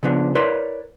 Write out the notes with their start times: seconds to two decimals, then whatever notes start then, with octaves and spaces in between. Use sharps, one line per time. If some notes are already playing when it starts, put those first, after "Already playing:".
0.03 C#3 F3 B3 D4
0.35 E4 A#4 B4 C#5 D5 C6